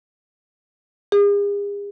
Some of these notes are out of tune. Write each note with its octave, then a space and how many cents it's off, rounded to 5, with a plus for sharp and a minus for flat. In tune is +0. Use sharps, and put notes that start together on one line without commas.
G#4 -40